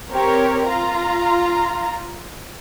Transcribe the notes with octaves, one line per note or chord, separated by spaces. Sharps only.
C4 G4 A#4 C#5
F4 A#5